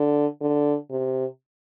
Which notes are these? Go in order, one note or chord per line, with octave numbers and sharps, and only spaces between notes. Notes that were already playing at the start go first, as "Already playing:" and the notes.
Already playing: D3
D3
C3